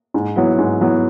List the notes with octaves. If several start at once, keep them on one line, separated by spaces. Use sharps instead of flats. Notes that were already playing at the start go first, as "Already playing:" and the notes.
G#2
F#3 B3 E4
G#2
F#3 B3 E4